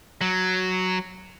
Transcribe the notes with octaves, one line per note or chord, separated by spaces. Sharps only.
F#3